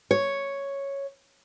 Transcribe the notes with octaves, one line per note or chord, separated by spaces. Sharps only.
C#5